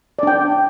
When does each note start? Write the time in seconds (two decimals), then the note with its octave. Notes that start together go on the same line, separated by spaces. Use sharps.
0.19 D5
0.23 D4
0.27 G5